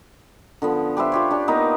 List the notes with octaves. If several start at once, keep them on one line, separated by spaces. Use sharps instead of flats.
D3 F3 B3
G4 B4 C5 E5
F4 G4 C#5
D4 G4
A#3 B3 D#4 A#4